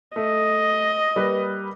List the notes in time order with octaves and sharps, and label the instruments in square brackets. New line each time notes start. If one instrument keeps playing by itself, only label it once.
[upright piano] A3 [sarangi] D#5
[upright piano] G3 A#3 B4